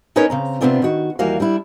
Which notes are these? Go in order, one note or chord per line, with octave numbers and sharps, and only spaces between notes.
C#4 D#4 A#4 B4 C#5
C#3 C4 A#5
C3 E3 B3 C4 D4 F4
D#3 F#4
D#2 E3 G3 A#3 F#4 F5
G3 D4 E4